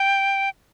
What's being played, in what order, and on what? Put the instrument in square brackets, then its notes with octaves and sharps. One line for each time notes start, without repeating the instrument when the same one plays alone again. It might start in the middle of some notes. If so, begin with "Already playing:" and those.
Already playing: [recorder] G5